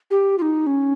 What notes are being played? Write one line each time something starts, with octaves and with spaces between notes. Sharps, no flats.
G4
F4
D#4
C#4